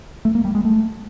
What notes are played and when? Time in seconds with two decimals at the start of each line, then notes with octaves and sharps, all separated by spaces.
0.25 A3
0.35 A#3
0.45 G3
0.55 G#3
0.65 A3